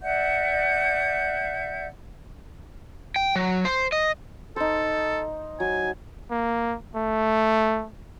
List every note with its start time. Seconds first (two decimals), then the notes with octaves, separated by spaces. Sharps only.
0.01 D5 E5 F#5 G6
3.16 G5
3.36 F#3
3.65 C5
3.92 D#5
4.56 D#4 A4 C5
5.60 F#3 G#5
6.30 A#3
6.95 A3